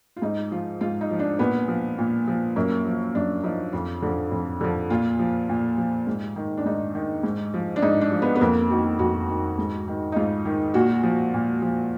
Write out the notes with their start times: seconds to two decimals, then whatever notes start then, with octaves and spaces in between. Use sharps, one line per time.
0.16 F4
0.22 G#2 D#4
0.51 F3 F4
0.81 G#2 F4
1.01 D#4
1.11 F3
1.19 D4
1.39 A#2 B3
1.68 F3
1.98 A#2
2.28 F3
2.56 F#2 A#3
2.85 F3
3.15 F#2 D4
3.43 F3 D#4
3.72 F2 F4
4.02 D3 F3
4.31 F2
4.61 D3 F3
4.90 A#2 F4
5.19 F3
5.49 A#2
5.77 F3
6.07 G#2
6.36 D#3
6.57 D4
6.65 G#2 D#4
6.95 D#3
7.23 G#2
7.54 F3
7.76 D4
7.82 G#2 D#4
8.01 D4
8.11 F3
8.22 B3
8.35 B3
8.41 F2 A#3
8.70 D#3 F#4
8.99 F2 F#4
9.29 D#3
9.58 G#2
9.88 D#3
10.12 D#4
10.16 G#2 F4
10.45 D#3
10.74 A#2 F#4
11.03 F3
11.34 A#2
11.62 F3